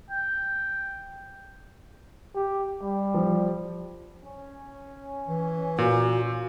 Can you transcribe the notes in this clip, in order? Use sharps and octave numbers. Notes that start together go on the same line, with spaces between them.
G5
G4
G3
F3
C#4
E3
A#2 F#4